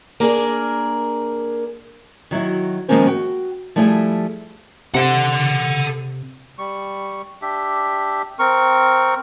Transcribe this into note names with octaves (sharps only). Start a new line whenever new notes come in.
A#3 D4 G#4 A#4
D#3 F#3 E4 F#4
D#3 F3 G#3 A#3 C#4 C5
F#4 G5
F3 G3 A3 E4 G4 G#4
C3 A4 F#5
G3 C#6
D4 G4 E5
C4 A#4 C#6